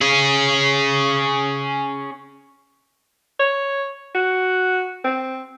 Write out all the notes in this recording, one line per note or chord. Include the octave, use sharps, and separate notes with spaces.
C#4 G#4
C#5
F#4
C4